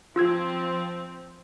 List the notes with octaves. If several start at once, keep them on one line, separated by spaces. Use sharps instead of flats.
F3 C4 F4 E6 G#6